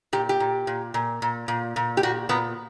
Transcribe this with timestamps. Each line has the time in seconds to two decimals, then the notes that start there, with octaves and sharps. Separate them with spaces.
0.13 A#2 G4
0.29 G4
0.40 A#2
0.67 A#2
0.94 A#2
1.22 A#2
1.48 A#2
1.76 A#2
1.97 G4
2.03 A#2 F#4
2.29 A#2 B3